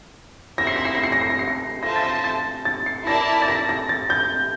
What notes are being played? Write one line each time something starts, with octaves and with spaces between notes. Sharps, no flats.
C4 E4 A#4 E5 A#6
C7
A#6
C7
A#6
C7
A#6
C7
A#6
C7
A#6
F4 A4 C5 E5 A5 A#6
A6
A#6
A6
A6
C7
E4 A#4 D5 A5 A#6
A6
A#6
A#6
A6
G6